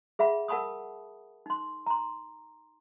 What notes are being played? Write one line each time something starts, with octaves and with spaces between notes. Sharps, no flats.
G#4 E5 F#5 B5
A#4 F#5 A5 B5 C#6 D#6
D#4 C6
A#5 C6